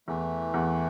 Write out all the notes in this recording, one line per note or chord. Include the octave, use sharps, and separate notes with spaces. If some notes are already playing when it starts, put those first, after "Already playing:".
E2 E3 A3
E2